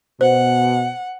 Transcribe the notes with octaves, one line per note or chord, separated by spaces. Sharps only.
B2 C5 F#5